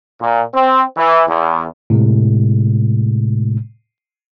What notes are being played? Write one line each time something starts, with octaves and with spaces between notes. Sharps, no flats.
A#2
C4
E3
E2
A2 C3 G#3